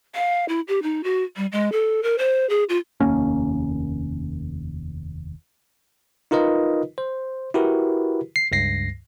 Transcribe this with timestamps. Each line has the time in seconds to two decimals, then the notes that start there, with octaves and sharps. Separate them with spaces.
0.15 F5
0.49 E4
0.68 G4
0.83 D#4
1.04 F#4
1.37 G3
1.52 G#3
1.72 A4
2.03 A#4
2.18 C5
2.49 G#4
2.69 F4
3.00 F1 D#2 A#3 C#4
6.31 D#4 F4 A#4 B4 D#5
6.98 C5
7.54 E4 F#4 G4 A#4 B4
8.36 C7
8.52 C#2 G2 A#6 C7